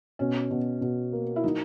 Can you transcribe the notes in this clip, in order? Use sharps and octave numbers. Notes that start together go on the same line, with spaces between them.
B2 C#4
B2
B2
A#3
E4
F#3 D#4